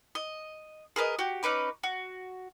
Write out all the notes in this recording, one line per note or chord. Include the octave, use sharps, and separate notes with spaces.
D#5
G#4 A#4 B4 D#5
F#4 G4
C#4 D#4 B4 D6
F#4